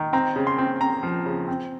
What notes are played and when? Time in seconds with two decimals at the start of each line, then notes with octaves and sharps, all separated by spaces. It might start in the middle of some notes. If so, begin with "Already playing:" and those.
Already playing: D#3
0.13 C4 A#5
0.36 C#3
0.47 C6
0.58 C4
0.81 C4 A#5
1.03 F3
1.26 C#3
1.48 C4